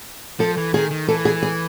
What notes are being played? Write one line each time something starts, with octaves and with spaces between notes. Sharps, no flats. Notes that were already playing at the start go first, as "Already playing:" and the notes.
F3 A4
E3
D#3 G#4
D#3
E3 A4
G#4
G#4